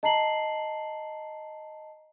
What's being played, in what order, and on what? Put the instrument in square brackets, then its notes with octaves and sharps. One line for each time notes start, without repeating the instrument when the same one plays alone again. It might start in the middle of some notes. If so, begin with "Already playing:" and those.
[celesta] D#5 A5 A#5 C7 F#7